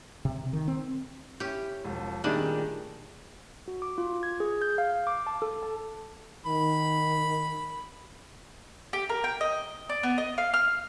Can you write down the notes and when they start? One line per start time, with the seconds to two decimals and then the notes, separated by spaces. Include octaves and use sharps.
0.25 C3
0.53 D#3
0.68 C4
1.40 C#4 E4 G4
1.84 E1 F3
2.24 A#2 D#3 G3 A3 D4 G4 G#4
3.68 F#4
3.82 D6
3.98 F4
4.23 G#6
4.40 G#4
4.62 G6
4.78 F5
5.07 D6
5.27 A5
5.42 A4
5.63 A5
6.46 D#3 B5
8.93 G4
9.09 A#4
9.24 G5
9.41 D#5
9.89 D5
10.03 B3
10.18 D#5
10.38 F5
10.54 F6